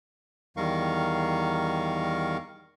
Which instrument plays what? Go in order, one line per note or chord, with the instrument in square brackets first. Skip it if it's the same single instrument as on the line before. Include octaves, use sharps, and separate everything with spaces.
[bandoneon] E2 D#3 G3 A#4 F5 C#6